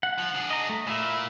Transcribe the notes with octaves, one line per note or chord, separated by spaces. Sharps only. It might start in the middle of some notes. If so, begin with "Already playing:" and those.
F#5
F3
D4 G#4
D#5 A#5
A3
A#2 E4 E5